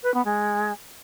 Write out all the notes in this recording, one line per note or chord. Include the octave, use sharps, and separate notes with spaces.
B4
B3
G#3